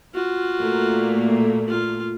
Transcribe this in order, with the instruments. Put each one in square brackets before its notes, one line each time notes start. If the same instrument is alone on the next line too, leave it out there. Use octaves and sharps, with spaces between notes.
[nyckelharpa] F4 F#4
[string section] A#2 A3 A#3
[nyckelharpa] F4